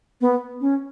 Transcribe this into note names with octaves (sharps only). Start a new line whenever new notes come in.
B3
C#4